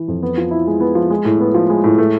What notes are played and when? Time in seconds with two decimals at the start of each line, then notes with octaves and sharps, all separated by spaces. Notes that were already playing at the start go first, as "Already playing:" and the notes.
Already playing: E3
0.08 F2
0.23 B3
0.37 F3
0.51 E4
0.67 G#3
0.80 B3
0.95 F3
1.10 G#3
1.25 A2
1.40 B3
1.54 F3
1.70 G#3
1.84 A2
1.98 A3